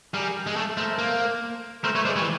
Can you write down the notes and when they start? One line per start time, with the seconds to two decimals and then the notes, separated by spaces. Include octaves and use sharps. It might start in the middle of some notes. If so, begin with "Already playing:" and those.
0.14 G3 G#4 A#4
0.47 G#3
0.56 A3
0.77 A3 A#4 C5
0.98 A#3
1.84 A3 A#4 C5
1.95 A3 B4 C#5
2.05 G#3 C5 D5
2.16 G3 B4 C#5
2.22 E3